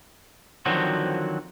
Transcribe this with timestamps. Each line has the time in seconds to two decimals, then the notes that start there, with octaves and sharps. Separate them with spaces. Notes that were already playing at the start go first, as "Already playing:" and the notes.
0.66 D3 D#3 F3 F#3 C4 F#4